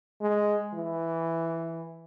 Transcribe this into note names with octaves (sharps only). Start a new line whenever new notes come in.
G#3
E3